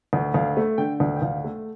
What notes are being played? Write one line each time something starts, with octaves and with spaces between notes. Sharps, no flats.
D2
D2 F5
A3
D3 G5
D2
G5
D2 F5
A3